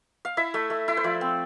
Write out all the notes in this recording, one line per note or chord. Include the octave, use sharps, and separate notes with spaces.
F5
E4 E5
A3
A3
E4
C5
F3 D5
C4